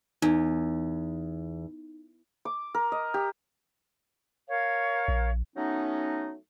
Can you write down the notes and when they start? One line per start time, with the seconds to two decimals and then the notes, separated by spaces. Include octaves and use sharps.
0.22 E2 D#4
2.45 D6
2.75 A#4
2.92 D#5
3.14 G4
4.49 A#4 C#5 F5
5.08 A#1
5.57 F#3 A3 B3 C#4 D#4